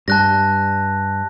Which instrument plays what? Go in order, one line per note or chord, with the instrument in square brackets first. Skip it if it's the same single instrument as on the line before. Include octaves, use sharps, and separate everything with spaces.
[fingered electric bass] G2 G3 [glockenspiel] A5 F#6 A#6